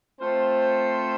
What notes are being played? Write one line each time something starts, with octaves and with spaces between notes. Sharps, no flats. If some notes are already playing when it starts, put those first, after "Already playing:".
A3 C4 F4 C5